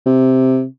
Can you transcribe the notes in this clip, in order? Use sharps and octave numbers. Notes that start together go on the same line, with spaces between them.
C3